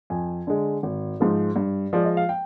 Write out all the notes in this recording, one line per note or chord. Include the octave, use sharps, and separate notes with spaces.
F2 G#5
D3 G#3
G#1
G#2 F3 G#3
G2
F3 G#3 D5
D#5
F5
G5